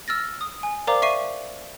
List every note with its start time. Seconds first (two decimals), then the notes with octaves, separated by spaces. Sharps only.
0.08 E6 F6 A6 A#6
0.41 D#6
0.63 G#5
0.87 A#4 C5 D5 F5 A#5 D6
1.02 E5 C#6 C7 D#7